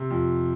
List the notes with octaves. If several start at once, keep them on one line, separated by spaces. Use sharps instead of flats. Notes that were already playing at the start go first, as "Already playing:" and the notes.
Already playing: C3
F2